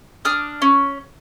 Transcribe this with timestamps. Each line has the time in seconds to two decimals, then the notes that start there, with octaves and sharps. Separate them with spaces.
0.25 D4 D#6 F6
0.62 C#4